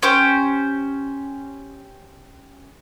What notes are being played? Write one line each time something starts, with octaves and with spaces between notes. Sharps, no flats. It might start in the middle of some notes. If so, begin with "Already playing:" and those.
C#4 G4 C5